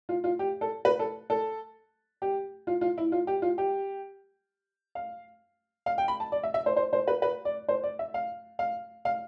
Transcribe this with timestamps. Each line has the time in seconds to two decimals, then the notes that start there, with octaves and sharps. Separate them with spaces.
0.09 F4
0.24 F4
0.39 G4
0.61 A4
0.85 B4
0.99 A4
1.30 A4
2.22 G4
2.67 F4
2.81 F4
2.98 E4
3.12 F4
3.27 G4
3.42 F4
3.58 G4
4.95 F5
5.86 F5
5.98 G5
6.08 B5
6.20 A5
6.32 D5
6.43 E5
6.54 E5
6.66 C5
6.77 C5
6.93 C5
7.08 B4
7.22 B4
7.45 D5
7.69 C5
7.83 D5
7.99 E5
8.14 F5
8.59 F5
9.05 F5